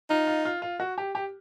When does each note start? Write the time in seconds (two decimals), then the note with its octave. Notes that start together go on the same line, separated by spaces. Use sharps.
0.10 D#4 F4
0.27 F4
0.45 F4
0.62 F4
0.80 F#4
0.98 G4
1.15 G4